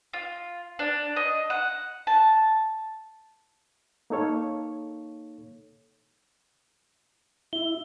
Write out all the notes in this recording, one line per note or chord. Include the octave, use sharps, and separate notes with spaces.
F4
D4
D#5
F#5
A5
A#3 D#4 A4 C#5 F5
E4 G7